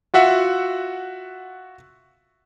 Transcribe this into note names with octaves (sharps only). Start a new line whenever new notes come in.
F4 F#4 E5 F#5